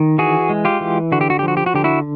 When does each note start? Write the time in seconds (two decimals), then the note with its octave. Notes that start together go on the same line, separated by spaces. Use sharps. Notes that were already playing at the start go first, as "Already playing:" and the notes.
Already playing: D#3
0.18 E3 F#4 G#4
0.49 G#3
0.65 F4 G4
0.81 E3
1.12 D3 F#4
1.21 G4
1.30 F#4
1.39 G4
1.43 F3
1.48 F#4
1.57 G4
1.66 F#4
1.74 D3 G4
1.84 E4 F#4